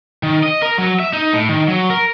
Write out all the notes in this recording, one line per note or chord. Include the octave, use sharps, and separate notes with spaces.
D#3
D#5
A#4
F#3
E5
D#4
A2
D#3
F#3
A#4